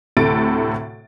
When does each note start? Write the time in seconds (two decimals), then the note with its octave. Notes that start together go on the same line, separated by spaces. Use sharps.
0.17 D2 A2 C3 A4 A6 D7